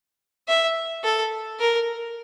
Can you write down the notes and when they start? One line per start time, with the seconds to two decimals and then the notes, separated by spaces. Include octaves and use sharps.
0.48 E5
1.04 A4
1.60 A#4